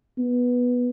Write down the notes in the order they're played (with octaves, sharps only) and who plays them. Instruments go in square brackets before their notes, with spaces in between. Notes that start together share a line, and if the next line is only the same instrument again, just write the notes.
[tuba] B3